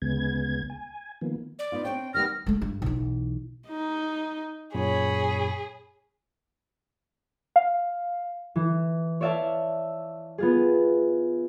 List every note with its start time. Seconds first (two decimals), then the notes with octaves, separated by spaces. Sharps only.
0.02 D2 C#3 G#3 B3 G#6
0.70 G#5
1.21 D#3 F3 A#3 B3
1.59 D5
1.72 B3 D#4 F4
1.85 C4 D4 C#5 G5
2.14 D#3 G3 B3 F6 A#6
2.46 G#3 A3
2.62 G2
2.82 B1 E3
3.68 D#4
4.75 F#2 A#2 G#4 C#5 B5
7.56 F5
8.56 E3
9.21 C#5 D5 E5 F5 A5
10.38 B3 F4 G#4